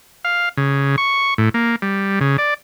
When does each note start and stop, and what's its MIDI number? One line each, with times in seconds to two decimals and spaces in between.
0.25 0.49 77
0.57 0.96 49
0.98 1.34 85
1.38 1.49 45
1.54 1.76 58
1.82 2.19 55
2.21 2.37 49
2.38 2.54 74